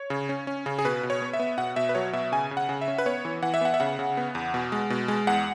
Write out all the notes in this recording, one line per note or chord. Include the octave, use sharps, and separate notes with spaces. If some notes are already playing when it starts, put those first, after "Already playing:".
Already playing: C#5
C#3
C#4
C#4
C#3
G#4
B2 B4
B2
C#5
B3
E5
B3
B2 F#5
B2 E5
B4
F#3 C#5
B2 E5
C#3 G#5
C#3
F#5
C#3
E5
C#4
B4
B3 C#5
E3
E3 F#5
E5
B3 F#5
E5
C#3 F#5
C#3
B3
E2
B2
G#3
B2
G#3
E2 F#5